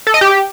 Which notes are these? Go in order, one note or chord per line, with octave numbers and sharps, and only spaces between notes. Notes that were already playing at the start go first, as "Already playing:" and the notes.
A4
D#5
G4